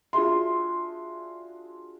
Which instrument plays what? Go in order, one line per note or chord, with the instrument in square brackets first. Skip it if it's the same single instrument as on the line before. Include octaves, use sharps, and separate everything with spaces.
[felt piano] D4 F4 F#4 G#4 E5 C6